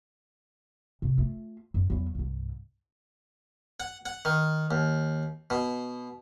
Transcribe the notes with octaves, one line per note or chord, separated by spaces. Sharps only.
C3
A3 F4
F#2
E2 F#3
C2 G2
F#5
F#5
D#3
D#2
B2